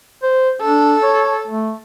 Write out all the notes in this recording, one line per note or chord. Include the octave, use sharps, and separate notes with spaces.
C5
D4 A4
C#5
A3